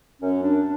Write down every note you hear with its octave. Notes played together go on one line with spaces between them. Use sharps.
F#2 C#4
D4